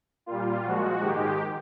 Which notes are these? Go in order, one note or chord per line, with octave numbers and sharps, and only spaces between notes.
A#2 G3 F4
A#2 F3 G#3 F#4
G#2 D#3 G#3 G4